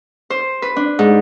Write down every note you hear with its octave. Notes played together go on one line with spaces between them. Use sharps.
C5
B4
D4
G#2